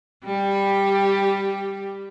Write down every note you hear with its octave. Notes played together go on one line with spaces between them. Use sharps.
G3 G4